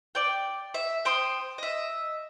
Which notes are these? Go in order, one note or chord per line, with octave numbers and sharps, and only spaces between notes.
D5 G5
E5
C5 G5 C6 D#6
D#5 E5